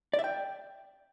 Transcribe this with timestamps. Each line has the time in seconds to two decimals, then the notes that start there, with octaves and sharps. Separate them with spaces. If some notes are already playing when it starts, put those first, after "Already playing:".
0.13 D5
0.19 E5
0.24 G5